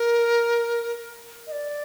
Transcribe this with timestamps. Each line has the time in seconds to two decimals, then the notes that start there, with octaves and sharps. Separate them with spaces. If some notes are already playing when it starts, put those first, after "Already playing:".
Already playing: A#4
1.47 D#5
1.52 D5